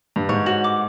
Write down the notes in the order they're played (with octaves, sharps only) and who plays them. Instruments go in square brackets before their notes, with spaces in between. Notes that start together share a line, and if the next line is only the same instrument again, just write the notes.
[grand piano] G2
[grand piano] G#2 [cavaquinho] C#5
[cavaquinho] F#4
D6